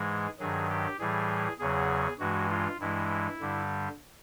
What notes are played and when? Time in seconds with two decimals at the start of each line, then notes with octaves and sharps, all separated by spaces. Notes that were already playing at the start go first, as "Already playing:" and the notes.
Already playing: G#2 E3 G#3 G#4
0.39 G2 D#3 F#3 G#4
0.69 G4
0.99 A2 E3 G3 G#4
1.59 E2 C#3 F#3 G#4
2.19 G2 E3 G#3 F#4
2.50 F4
2.80 G2 E3 G#3 E4
3.40 G2 D3 G3